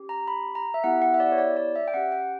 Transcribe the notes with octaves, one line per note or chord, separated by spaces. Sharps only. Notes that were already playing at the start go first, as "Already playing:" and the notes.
Already playing: C#4 G4
A#5
B5
A#5
E5
B3 E4 G4 F#5
F#5
E5
D5
C#5
D5
D5
E5
G5
C#4 G4 F#5
G5